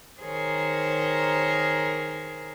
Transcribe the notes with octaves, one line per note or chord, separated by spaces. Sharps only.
D#3 G#4 A#4 C5 C#5